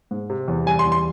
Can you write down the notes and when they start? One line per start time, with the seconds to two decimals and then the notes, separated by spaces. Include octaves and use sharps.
0.11 G#2
0.30 C3
0.48 E2
0.66 G3 G#5
0.79 C6
0.86 E2
0.92 C6